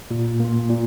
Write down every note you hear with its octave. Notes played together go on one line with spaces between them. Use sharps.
A#2
A#3 F4
A#2